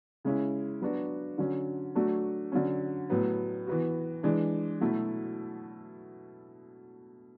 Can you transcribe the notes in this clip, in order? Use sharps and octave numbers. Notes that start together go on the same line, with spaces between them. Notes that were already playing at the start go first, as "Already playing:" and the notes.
C#3 G#3 C#4 E4
F#3 B3 D4 F#4
D3 F#3 C#4
F#3 A3 D4 F#4
D3 F#3 C#4
A2 F#3 B3
E3 B3 F#4
E3 G#3 D4
B2 F#3 A3 E4